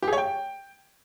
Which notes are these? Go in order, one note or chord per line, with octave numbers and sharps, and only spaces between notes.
G4
G#4
C#5
G5